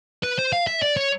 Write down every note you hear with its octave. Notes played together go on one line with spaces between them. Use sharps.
B4
C5
F5
E5
D5
C#5